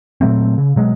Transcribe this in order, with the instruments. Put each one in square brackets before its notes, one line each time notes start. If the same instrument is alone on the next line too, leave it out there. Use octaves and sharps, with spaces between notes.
[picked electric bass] A#2 F#3 A3 C4
C#3
B2 F#3 G#3